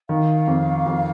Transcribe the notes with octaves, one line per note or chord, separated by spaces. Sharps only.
D#3 F5
F2
F2